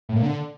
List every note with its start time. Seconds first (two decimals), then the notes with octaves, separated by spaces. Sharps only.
0.09 A2
0.16 A#2
0.22 D3